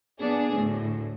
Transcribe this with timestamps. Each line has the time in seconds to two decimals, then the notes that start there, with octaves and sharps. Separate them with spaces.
0.19 B3 D4 G#4
0.55 D2 A2